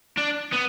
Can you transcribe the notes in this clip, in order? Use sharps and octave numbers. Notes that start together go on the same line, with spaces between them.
D4
B3